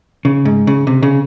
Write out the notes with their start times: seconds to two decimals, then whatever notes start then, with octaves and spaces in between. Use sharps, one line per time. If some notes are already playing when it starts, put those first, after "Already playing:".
0.25 C#3
0.45 G#2
0.67 C#3
0.87 C3
1.03 C#3